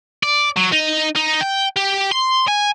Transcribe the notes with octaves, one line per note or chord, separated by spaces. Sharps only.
D5
F#3
D#4
D#4
G5
G4
C6
G#5